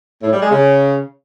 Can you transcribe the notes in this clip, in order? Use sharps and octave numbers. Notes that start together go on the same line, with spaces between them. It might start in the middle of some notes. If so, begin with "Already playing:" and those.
A2
G3
G#3
C#3